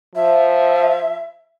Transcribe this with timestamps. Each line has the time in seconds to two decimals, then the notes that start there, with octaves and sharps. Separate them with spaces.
0.15 F3 E5